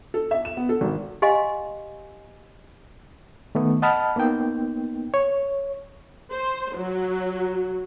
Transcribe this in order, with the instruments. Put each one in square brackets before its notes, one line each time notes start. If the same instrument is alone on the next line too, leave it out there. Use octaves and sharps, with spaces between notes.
[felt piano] A4
E5
E7
B3
A4
G#1
[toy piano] G4 D#5 F5 G#5 C6
[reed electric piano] D#3 A3 B3
D#5 F#5 A5 B5 F6
A#3 B3 D#4 G5
C#5
[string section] C5
F#3